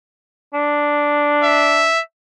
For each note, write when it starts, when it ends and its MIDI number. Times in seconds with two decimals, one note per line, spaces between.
0.54 1.88 62
1.44 2.01 76